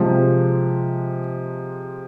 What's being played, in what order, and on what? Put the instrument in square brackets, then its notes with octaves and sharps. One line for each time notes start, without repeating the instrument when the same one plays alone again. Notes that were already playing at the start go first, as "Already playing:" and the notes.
Already playing: [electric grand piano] C3 F3 G#3